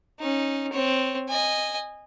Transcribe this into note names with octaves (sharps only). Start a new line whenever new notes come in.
C#4 D#4
C4 C#5
D#5 G#5